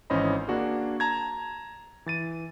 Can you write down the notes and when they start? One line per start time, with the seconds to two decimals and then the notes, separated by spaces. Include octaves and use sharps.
0.10 G#1 E3 C#4 C5 D#5 B5
0.48 A#3 D4 F#4 G#4
1.00 A5 A#5 G#6
2.06 E3 A6 D#7